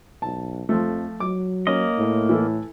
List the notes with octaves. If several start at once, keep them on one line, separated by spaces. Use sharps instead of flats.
B1 A5
F2 F3 A3
F#3 D6
A#3 C#4 D#5
A2
E3 E4 A4